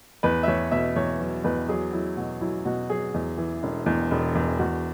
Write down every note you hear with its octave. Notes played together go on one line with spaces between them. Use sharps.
E2 B4
E5
E2 C#5
B2 E5
E2 C#5
F#3
E2 B4
F#3 G#4
F#3 E4
B2 F#4
F#3 E4
B2 F#4
F#3 G#4
E2
E3
E1
E2
E1
E2
E2 F#4